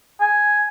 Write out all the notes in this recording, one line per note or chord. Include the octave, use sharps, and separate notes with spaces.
G#5